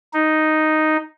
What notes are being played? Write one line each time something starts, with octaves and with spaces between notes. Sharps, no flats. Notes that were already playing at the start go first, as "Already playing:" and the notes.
D#4